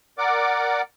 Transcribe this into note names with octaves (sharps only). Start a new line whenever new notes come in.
A#4 D5 F#5 D6